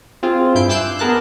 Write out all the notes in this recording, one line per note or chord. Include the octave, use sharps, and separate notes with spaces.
C4 F4 G#4
G2 E4 G6 C7 D7
D6 E6 F#6 G6 C7 E7
B3 G#4 A#4 A5 F#6